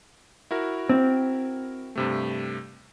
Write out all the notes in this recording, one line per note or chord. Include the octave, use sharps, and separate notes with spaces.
E4 F#4 A#4
C4
G2 C3 A3